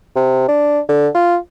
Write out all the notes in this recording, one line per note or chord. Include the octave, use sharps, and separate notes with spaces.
C3
D4
D3
F4